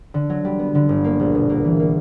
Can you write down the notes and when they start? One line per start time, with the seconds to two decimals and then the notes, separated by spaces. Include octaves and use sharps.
0.14 D3
0.30 F#3
0.45 G3
0.59 B3
0.75 D3
0.89 G1
1.04 A#3
1.19 A#1
1.35 B2
1.49 A#3
1.65 E3
1.79 A#3